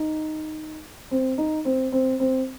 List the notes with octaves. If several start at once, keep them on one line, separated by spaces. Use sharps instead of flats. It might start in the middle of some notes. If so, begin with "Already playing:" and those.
Already playing: D#4
C4
D#4
C4
C4
C4